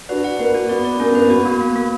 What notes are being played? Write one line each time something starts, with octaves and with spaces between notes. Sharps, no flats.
D4 F#4 B4
F#5
A#3 B4
F#4
B3 D5
D5
A#3 C#4
B3
A#3 B4
B3 F#4
A#3
A#3
A#3